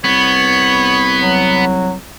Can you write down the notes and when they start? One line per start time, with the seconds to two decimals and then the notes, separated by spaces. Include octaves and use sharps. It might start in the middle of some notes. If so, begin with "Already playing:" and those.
0.04 C2 B3 C#5
1.20 F#3